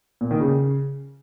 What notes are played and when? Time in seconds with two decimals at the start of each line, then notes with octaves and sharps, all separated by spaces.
0.21 A#2
0.31 D#3
0.40 C#3